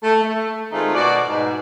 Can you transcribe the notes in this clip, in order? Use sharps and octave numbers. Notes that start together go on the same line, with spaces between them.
A3
A3
D#3 G#3 A3 C4 D#4 F4
B2 F#4 D5
G#2 B2